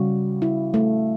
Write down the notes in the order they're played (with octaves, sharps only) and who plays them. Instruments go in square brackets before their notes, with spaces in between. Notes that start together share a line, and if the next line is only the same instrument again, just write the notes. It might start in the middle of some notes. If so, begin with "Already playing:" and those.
Already playing: [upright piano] C#3 G3 [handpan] F#4
[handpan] E4
A3